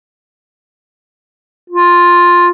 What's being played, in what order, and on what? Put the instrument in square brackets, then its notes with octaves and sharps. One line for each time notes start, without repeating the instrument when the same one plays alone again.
[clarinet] F4